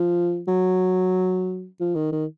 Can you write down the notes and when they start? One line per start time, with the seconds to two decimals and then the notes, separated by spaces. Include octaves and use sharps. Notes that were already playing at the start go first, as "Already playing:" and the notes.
Already playing: F3
0.48 F#3
1.80 F3
1.95 D#3
2.12 D#3